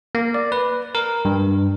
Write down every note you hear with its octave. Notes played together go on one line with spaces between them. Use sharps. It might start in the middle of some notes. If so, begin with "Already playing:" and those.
A#3
D5
B4
A#4
G2